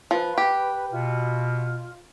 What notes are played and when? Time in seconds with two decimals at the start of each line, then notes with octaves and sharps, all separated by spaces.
0.11 F3 B4
0.38 G4
0.92 B2 F4